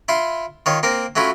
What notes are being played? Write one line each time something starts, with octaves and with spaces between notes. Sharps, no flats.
E4 F4 C6
D#3 F4 C#5
A#3 C4 A#4
F#3 A3 C#4 E4 F4